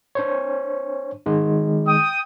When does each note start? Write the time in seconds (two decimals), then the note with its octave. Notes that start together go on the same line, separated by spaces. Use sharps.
0.15 D4 C5 C#5
1.26 D#3 G#3 D#4
1.87 G5 D#6